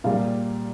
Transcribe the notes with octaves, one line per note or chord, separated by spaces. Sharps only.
A#2 G3 F5